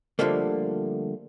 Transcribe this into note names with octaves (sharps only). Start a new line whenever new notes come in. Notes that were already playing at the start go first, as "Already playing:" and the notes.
D3 F3 G3 A3 A#3